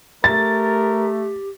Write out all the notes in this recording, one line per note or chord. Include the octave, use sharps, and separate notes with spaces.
A3 G4 A#4 A6